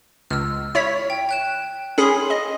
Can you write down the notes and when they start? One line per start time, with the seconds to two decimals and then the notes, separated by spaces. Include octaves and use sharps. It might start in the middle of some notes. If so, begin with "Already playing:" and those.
0.30 C#2 E6 F6
0.75 E4 C#5 B6
1.10 G5
1.29 G5 F#6 E7
1.98 C#4 G#4 B5 C6
2.30 D#5